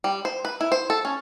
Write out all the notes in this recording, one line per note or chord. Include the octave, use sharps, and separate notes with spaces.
G3
C5
B4
E4
C5
A4
C#4